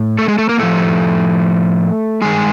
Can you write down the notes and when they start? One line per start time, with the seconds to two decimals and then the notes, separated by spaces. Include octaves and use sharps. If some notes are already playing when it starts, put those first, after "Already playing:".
Already playing: A2
0.18 A3 A4
0.28 G#3 G#4
0.38 A3 A4
0.49 A#3 A#4
0.58 A2 F3 A3 A4
2.22 G2 D#3 G#3 G#4